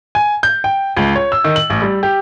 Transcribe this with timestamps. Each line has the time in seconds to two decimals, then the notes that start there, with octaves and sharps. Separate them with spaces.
0.15 G#5
0.43 G6
0.64 G5
0.97 C#2
1.15 C#5
1.32 E6
1.44 D#3
1.56 F#7
1.70 A1
1.82 G3
2.03 G4